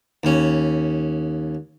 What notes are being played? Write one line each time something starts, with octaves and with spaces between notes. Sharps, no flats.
D#2 C#4